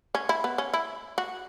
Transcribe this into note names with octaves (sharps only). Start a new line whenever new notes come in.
C#4
E4
B3
C#4
E4
F#4